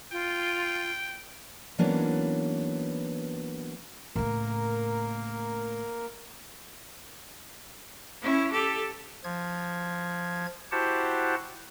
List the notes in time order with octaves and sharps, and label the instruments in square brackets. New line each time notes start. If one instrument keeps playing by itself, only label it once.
[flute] F4 [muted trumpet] G5
[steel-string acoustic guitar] E3 F#3 A#3 B3 C#4 D4
[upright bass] A2 C#3 [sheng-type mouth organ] A#3 A#4
[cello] C#4 E4
G4 A4
[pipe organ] F3 G#6
E4 F#4 G4 C5 F#5 A5